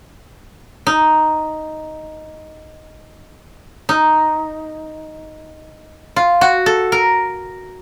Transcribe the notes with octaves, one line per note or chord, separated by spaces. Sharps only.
D#4
D#4
F4
F#4
A4
A#4